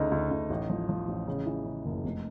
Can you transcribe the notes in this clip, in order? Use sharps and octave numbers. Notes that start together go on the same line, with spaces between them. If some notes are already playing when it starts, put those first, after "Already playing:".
Already playing: D2 C#3 D#4
D2
D2
A1
F3
F3
A1
C#3
E3
C#3
F#1
F1